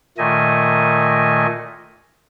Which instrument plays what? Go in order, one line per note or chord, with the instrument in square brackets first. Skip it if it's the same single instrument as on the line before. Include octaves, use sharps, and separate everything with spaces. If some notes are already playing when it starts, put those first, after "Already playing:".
[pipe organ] A#2 D#3 A3 D#5 G#5